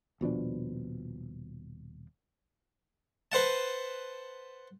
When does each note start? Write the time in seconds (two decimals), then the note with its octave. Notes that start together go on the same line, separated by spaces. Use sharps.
0.21 D#1 B2 F3 D4
3.32 B4 C5 F#5 A5